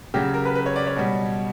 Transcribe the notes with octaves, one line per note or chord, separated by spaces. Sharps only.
C#3 F#3 G4
A#4
B4
B4
C#5
D5
C#5
B2 G3